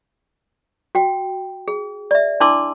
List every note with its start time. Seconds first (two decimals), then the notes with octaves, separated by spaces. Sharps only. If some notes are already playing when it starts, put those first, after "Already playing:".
0.95 F#4 G5
1.68 G#4
2.11 D5 E5
2.40 D4 E4 A5 C6 D6 E6